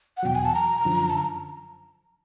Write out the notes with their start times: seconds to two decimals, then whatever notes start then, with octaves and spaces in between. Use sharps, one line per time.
0.17 F#5
0.23 E2 B2 F#3 G5
0.35 G#5
0.45 A5
0.54 A#5
0.85 F#2 D3 F3
1.10 A5
1.18 A#5